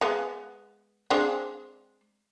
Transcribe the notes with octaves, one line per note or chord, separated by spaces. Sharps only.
G#3 B3
G#3 C4 D4